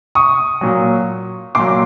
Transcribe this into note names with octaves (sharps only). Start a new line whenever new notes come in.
C#6 D#6
A#2 F#3
A#2 F#3 C6 D6